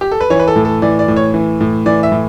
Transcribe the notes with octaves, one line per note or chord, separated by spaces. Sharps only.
G4
A4
B4
E3 C#5
B4
A4
A2
A4
E3 D5
D5
A2
C#5
E3
A2
E3 D5
E5
A2